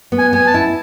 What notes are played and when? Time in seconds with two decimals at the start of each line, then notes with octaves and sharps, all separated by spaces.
0.12 B3
0.18 G#5
0.33 B3 G#5
0.47 A5
0.54 E4